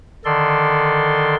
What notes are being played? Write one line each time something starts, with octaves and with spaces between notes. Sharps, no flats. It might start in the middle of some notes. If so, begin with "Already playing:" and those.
D3 D#3 A4 D5 C6